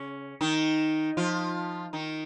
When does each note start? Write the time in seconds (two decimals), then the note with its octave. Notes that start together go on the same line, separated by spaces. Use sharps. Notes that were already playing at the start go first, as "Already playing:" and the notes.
Already playing: C#3 C#4
0.41 D#3 D#4
1.17 F3 F4
1.93 D#3 D#4